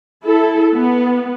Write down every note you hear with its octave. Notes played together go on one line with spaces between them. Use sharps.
E4 A4
B3